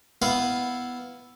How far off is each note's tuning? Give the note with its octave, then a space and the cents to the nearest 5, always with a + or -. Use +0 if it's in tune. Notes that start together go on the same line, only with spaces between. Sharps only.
B3 +0 E4 +0 F5 +0